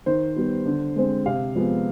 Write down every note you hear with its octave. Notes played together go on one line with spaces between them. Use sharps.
D#3 C5
G3 B3
D3
G#3 C4
C3 F5
F3 G#3 B3